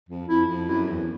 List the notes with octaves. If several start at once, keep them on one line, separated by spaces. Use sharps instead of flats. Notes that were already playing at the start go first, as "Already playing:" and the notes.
F2
F2 E4
F2
F#2 E4
E2